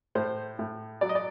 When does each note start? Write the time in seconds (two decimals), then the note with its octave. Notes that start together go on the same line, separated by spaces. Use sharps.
0.15 A2 C5
0.59 A2
1.01 F#3 D5
1.09 D#5
1.15 D5